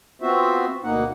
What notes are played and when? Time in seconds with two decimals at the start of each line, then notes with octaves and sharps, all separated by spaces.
0.22 B3 C4 F4 F#4 C5 E5
0.84 D2 B2 A#3 D#4 F#5